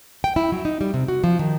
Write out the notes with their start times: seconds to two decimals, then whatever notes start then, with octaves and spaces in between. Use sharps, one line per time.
0.24 G5
0.36 E4
0.52 F#3
0.65 D#4
0.81 G3
0.94 C3
1.08 F#4
1.24 F3
1.39 D#3